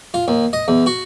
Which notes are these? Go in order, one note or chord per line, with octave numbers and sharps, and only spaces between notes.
F4
D#2
D#5
E2
F#4